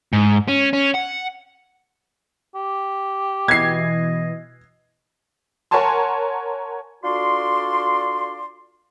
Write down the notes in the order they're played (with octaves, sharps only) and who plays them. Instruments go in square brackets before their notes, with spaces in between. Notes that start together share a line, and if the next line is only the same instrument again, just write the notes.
[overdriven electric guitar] G#2
C#4
C#4
F#5
[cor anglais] G4
[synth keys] B2 E3 [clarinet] D#5 [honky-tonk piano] G#6 C7
[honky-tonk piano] A#4 C#5 F#5 G#5 A5 C6
[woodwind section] D4 F4 F#4 A4 D5 C6